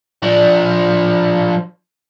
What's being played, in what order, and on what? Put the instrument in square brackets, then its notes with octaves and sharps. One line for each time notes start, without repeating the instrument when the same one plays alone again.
[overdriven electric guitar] F3 D4